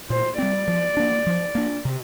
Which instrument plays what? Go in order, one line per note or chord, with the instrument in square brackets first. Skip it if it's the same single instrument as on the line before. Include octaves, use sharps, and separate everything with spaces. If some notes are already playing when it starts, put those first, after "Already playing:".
[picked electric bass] A#2 [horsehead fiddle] C5
[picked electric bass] G3 C4 [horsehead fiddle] D5
[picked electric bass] F3
A#3 D4
F3
A#3 D4
C3